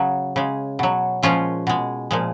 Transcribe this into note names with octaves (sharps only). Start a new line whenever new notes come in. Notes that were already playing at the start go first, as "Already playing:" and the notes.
Already playing: C#3 F#3
C#3 G#3
B2 F#3
A#2 F3 G#3 C#4 F4
B2 G#3
A#2 F3 G#3